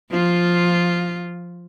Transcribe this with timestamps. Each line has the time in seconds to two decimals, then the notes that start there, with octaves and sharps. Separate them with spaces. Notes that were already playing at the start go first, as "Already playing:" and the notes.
0.11 F3 F4